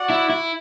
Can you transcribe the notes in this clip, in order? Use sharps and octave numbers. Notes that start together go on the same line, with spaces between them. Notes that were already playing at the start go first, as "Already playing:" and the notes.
Already playing: F#4 D5 F#5
E4
E4